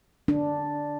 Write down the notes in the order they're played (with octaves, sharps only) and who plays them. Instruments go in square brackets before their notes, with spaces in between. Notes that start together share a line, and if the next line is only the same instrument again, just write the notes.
[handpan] D4